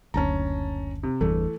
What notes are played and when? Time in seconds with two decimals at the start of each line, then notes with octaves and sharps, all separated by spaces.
0.14 F#1 D2 C#4 A5 A#5
1.03 C3
1.21 G1 E2 G2 E3 A3